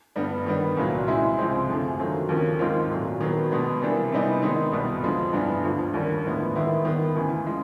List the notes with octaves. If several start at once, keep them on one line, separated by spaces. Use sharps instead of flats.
G2 D3 G3 B3
D#3 G3 B3
C2 A#2 F#3
C#3 E3 G#3 C4 E4
C#2 C3 F3 G#3 C4
F#2 D3 F3 A3
D#3 F#3 A3 C4 F4
D#2 C#3 F3 A#3 C#4
G#2 D#3 G#3 C4 F4
A#2 F#3 A3
D#3 F#3 B3
B2 G#3 B3 D4
C3 E3 G3 A#3 D4
C3 E3 G3 B3 D#4
D#3 G#3 B3 D#4
C2 B2 G3 B3
F2 D3 F3 G#3
G2 E3 G3 B3 D4
D2 D3 F3
D#2 D3 G3 A#3 C#4
A2 F3 G#3 B3
D#2 D#3 G#3 B3 E4
D#3 G3 B3
D2 C#3 E3
C#3 F3 G#3